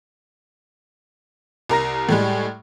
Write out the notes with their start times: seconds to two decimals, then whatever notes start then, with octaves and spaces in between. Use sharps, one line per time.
1.69 C2 A#4 A#5 A#6
2.09 A2 G3 G#3